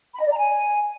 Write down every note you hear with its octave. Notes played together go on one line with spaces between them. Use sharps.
B5
D#5
D5
A#5
G#5